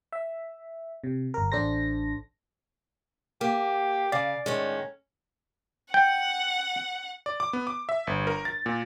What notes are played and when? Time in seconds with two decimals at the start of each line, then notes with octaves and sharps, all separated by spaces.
0.12 E5
1.04 C3
1.34 G1 A#4
1.52 A1 D4 A4 C5 A#6
3.41 A#3 G4
4.12 C#3 D5 F5
4.46 A2 D#3 G#3 C#4
5.94 F#5 G5
7.26 D5
7.40 D6
7.53 B3
7.67 D6
7.89 E5
8.07 G1
8.27 A#4
8.45 A6
8.66 A#2